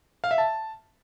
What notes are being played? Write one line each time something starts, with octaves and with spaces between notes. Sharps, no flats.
F5
E5
A5